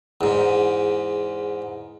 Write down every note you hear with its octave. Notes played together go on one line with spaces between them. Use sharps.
E2 G#2